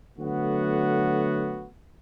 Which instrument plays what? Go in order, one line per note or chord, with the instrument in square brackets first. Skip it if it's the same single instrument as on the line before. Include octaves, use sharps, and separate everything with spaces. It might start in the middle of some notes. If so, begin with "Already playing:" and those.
[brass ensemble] D3 F#3 A3 B3 F#4